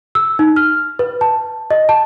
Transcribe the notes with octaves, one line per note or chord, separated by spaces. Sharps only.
E6
D#4
F6
B4
A5
D#5
A5